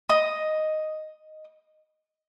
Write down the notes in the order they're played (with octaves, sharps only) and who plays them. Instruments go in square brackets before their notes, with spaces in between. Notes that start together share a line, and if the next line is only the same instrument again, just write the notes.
[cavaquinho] D#5 D#6